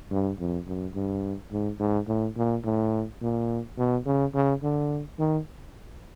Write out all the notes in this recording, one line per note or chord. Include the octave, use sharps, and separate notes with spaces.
G2
F2
F#2
G2
G#2
G#2
A2
A#2
A2
A#2
B2
C#3
C#3
D3
D#3